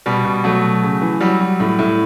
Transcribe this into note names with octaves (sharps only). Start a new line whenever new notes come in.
B2 G3
B2
F#3 A3
B2
C#3
E3
F#3 G3
F#3
A2
A2